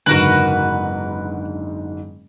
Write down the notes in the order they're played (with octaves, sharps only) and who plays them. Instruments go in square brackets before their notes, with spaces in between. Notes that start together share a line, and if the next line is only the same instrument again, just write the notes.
[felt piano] F#1 G#2 D3 [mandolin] F#4 A#4 B4